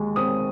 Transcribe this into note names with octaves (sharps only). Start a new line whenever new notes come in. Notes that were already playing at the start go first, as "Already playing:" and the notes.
Already playing: D#2 D#3 G#3
C4 D#6